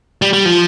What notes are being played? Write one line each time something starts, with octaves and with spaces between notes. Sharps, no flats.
G3
G3
F3